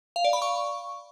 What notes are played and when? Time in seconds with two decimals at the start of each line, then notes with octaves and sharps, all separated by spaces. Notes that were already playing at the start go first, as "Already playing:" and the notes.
0.16 F5
0.25 D5
0.33 B5
0.42 C#6